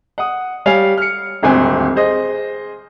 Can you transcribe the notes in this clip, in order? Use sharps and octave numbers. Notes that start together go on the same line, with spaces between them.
F#5 D#6
G3 C#5 F5 G#5 F7
F6 C#7
D#1 G#1 D2 C4 G#5
G#4 C5 D#5